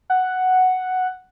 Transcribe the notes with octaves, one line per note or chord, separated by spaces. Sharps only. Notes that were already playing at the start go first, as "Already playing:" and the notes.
F#5